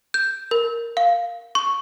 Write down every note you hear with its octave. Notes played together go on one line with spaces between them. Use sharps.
G6
A#4
F5
C#6